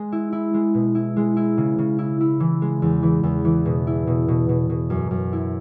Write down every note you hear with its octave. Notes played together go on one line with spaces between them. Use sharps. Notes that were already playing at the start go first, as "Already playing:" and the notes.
Already playing: G#3
E4
E4
G#3
B2
E4
G#3
E4
C#3
C#3
E4
E4
E3
G#3
E2
E3
E2
E3
B2
E4
B2
B2
B2
B2
F#2
F#2
E4